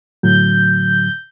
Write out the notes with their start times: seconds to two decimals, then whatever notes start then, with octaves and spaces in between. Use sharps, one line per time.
0.23 A2 D3 F#3 G6